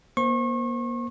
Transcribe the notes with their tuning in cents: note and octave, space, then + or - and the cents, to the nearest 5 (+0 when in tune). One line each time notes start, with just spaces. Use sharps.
A#3 +35 C5 +0 C#6 -35